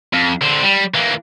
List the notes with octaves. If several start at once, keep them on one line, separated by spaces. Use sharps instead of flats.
F2
D3 C4
G3
E3 A#3